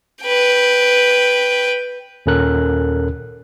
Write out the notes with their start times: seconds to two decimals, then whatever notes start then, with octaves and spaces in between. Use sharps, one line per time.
0.22 B4 G5
2.26 D#2 A#2 C#4 A4 A#4 F#6